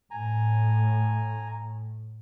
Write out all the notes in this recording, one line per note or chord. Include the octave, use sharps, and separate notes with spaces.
A2 G#5 A#5